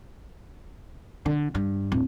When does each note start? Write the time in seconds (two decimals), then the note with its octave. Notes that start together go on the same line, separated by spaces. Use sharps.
1.26 D3
1.55 G2
1.92 D1